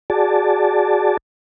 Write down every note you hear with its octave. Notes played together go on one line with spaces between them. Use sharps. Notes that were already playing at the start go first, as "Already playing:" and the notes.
F#4 G#4 D5 A5